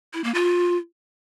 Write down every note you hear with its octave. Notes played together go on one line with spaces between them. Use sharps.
E4
A#3
F4